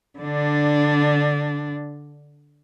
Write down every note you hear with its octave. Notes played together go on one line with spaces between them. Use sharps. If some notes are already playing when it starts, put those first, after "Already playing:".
D3 D4